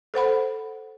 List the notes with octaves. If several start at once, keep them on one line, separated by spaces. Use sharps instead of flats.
A4 C5 F#5 B5